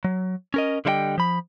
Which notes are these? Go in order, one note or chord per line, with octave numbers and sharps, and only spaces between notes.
F#3
C#4 A#4 D#5
D3 G3 E4 D#5 G5
F3 B5